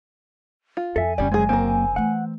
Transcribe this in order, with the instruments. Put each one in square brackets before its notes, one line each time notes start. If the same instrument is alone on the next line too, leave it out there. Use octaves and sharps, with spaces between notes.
[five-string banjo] F4
[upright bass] F2 [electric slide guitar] A4 E5 [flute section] G#5
[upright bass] F#1 D3 [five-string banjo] G3 G4 [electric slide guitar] C#4 D5
[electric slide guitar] F#2 B2 G#3 [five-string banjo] C4 G#4
[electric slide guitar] F#2 A#3 G5 [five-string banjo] C4 A#4
[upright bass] E3 A3 [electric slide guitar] F#5